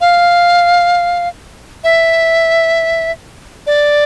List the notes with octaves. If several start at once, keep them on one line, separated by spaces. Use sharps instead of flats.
F5
E5
D5